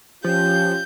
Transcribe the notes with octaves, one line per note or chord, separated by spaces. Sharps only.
F3 C#4 F4 G4 G6